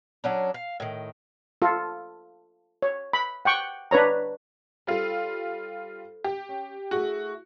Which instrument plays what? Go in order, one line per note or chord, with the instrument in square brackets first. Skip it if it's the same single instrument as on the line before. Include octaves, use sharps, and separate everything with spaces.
[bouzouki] F#3 C#4 D4
F5
A2 D#3
[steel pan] F4 A4
C#5
B5
F#5 G5 C#6
D4 B4 C#5 A#5
[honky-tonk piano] G3 F4 [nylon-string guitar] A4 C5
[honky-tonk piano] G4
[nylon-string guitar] C#4
[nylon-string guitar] A3 E4 G#4 [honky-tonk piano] F#4